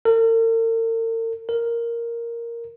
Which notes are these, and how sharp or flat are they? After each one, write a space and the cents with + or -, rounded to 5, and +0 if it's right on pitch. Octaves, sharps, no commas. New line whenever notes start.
A#4 -45
A#4 +0